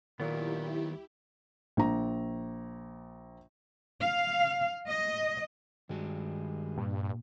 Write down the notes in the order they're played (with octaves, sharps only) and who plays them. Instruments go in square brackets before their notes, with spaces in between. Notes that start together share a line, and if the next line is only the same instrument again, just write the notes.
[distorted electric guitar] D#2 [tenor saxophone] A#2 [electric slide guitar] D#3 F#3 B3 [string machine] E4 G4
[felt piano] A#1 A#5
[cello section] F5
D#5
[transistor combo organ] G2 G#3 [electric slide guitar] D#3 F#4
[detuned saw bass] G2 [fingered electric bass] A#2